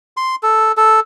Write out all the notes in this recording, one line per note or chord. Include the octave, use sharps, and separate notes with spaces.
C6
A4
A4